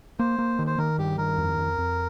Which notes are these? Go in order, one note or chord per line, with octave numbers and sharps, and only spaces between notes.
A#3 C5
A#3
D#3
C5
D#3 A#4
G2 G4
D#3 A#4
F2
F2
F2